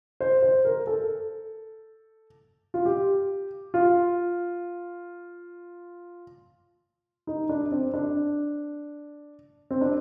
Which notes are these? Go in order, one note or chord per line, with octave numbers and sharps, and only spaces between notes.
C5
C5
A#4
A4
F4
G4
F4
D#4
D4
C4
D4
C4
D4